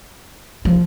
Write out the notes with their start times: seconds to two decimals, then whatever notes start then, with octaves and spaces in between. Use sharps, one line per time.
0.65 F3